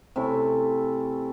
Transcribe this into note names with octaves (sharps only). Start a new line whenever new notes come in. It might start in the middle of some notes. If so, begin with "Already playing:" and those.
C3 A3 C#4 E4